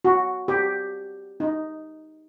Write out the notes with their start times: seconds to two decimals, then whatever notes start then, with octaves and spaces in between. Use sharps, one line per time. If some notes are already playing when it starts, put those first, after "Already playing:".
0.05 F#4
0.48 G4
1.40 D#4